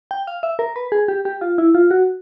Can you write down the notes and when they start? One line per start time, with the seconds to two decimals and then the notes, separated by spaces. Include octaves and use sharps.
0.11 G5
0.27 F5
0.43 E5
0.59 A#4
0.76 B4
0.92 G#4
1.08 G4
1.25 G4
1.41 F4
1.58 E4
1.75 F4
1.91 F#4